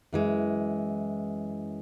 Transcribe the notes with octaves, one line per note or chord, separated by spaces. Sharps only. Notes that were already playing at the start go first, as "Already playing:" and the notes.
F#2 E3 G#3